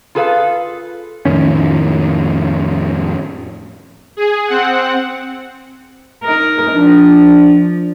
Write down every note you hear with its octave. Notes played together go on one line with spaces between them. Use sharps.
F4 G#4 A4 B4 E5 F5
F2 A2 D#3 C#4
G#4
C4 F#5
D#4 A#4
F3 D4